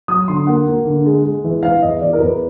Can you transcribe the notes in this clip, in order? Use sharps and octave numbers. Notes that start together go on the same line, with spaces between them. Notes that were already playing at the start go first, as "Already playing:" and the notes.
F#3 D#6
D3 C6
A#3 F#5
A#3
D3
G#3
G#3
E3
E3 F5
E2 D#5
E3 D5
A#4
E2 B4